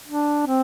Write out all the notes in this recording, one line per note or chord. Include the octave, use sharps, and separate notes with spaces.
D4
C4